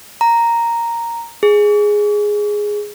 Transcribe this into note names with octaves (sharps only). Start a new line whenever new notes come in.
A#5
G#4